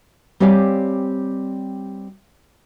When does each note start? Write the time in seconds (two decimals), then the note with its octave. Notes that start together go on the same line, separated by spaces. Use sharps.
0.40 G3 C4 G4 C#5 F5 G#5